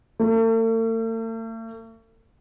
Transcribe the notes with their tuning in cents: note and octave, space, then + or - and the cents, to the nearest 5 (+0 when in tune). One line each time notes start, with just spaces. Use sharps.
A3 +45